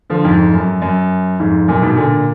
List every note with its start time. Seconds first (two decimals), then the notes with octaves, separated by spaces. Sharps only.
0.10 D3 F3
0.25 F2 G#2
0.53 F#2
0.82 F#2
1.39 F2 G#2
1.68 F#2 A#2
1.82 G#2 B2
1.97 A#2 D3